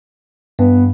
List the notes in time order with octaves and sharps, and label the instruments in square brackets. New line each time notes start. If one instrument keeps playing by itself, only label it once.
[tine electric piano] G2 [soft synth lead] B3